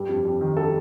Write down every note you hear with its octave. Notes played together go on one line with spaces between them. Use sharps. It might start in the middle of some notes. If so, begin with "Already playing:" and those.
Already playing: G2 G3
F2
F2
D#3
G3 A4